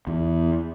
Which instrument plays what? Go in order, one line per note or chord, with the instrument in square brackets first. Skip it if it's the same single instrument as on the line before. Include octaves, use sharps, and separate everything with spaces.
[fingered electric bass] E2